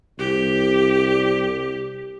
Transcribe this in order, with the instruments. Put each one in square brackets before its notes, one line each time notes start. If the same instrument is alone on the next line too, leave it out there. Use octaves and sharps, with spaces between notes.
[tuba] C2 [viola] G4